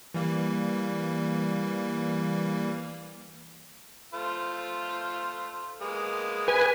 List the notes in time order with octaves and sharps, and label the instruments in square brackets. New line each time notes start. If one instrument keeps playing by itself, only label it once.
[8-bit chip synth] E3 G3 A#3
[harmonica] A3 F4 C5
G#3 A#3 B3
[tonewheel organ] B4 G#5